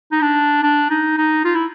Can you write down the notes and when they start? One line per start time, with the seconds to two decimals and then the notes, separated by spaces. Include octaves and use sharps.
0.12 D#4
0.21 D4
0.63 D4
0.90 D#4
1.18 D#4
1.44 F4
1.55 E4